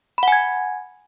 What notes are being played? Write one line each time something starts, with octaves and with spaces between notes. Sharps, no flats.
F#5 G#5 B5 G#6